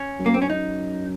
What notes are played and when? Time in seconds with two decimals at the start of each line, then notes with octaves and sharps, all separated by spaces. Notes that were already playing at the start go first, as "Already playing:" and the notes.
Already playing: C#4
0.19 F#2
0.26 A#3
0.34 C4
0.42 C#4
0.49 F#2 D#4